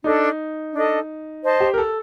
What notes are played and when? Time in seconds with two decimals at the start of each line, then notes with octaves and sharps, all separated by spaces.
0.04 D4 D#4 A4 D#5
0.73 D4 A4 D#5
1.43 C5 D#5 A5
1.60 G4
1.74 A#4
1.78 A4